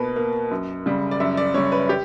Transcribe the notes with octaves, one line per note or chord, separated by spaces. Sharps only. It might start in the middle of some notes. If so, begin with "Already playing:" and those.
Already playing: B2 A#3 B4
A#3
F#2
C#3 G3
D5
F#2 E5
D5
C#3 G3 C#5
B4
G4